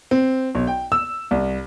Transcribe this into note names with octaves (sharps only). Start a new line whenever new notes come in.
C4
B1
G5
E6
C2